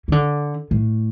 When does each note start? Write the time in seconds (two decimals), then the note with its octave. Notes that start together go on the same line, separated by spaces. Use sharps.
0.08 E3
0.12 D3
0.71 A2